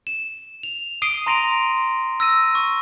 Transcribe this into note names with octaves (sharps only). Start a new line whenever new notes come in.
E7
F7
D#6 C7 D7 D#7 G7
A#5 C6 A#6 D7 D#7 F7
E6 A#6 D#7
C#6